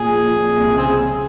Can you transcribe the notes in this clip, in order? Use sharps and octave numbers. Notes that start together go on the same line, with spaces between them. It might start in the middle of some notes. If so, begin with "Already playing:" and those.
Already playing: A#2 G#4
F3
A#2
C2
C#3 C4 G#4